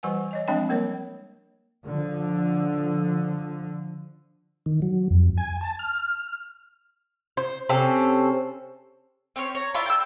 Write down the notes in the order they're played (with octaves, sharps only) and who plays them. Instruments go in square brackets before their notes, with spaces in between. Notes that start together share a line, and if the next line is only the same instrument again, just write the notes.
[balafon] E3 G3 B4 F#5 G#5
C#5 D#5 G#5
F3 G#3 C4 D4 D#5 G5
G3 A#3 A#4 C#5
[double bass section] D3 F3
[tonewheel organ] D#3
F#3
F2
G#5
A5
F6
[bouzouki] C5
C3 C4 C#4 A4
[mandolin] C4 C#4 C#5
C#5 A#5
E4 F4 D5 B5
G5 A5 E6